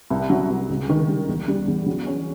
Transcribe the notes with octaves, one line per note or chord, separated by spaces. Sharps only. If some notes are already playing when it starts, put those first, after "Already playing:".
C2
F#3
C2
C#2
D#3
G3
E2
G3
E2
F#3
C#4